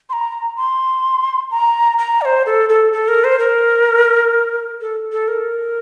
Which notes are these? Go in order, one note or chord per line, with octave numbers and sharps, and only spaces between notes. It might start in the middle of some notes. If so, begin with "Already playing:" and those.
C6
A#5
C6
A#5
A#5
D5
C5
A4
A4
A4
A#4
C5
A#4
A4
A4
A#4